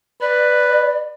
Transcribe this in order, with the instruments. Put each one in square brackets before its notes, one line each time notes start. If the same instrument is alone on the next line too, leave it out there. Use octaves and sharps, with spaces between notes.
[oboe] B4 [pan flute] D5